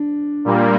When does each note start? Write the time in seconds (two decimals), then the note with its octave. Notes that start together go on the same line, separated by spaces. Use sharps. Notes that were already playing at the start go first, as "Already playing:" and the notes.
Already playing: D4
0.45 A#2 G3 A#3